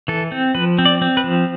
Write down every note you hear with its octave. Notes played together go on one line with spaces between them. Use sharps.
E3 A4
C4
F3 B4
C4
D5
C4
B4
F3